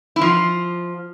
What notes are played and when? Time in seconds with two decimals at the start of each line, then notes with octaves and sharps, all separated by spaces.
0.16 E4
0.21 F3 F4